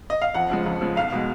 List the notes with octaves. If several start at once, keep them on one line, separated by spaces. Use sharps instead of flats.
D#5
F5
F2 F#5
C#3 F3 G#3
F2
C#3 F3 G#3
B1 F5
B2 G#3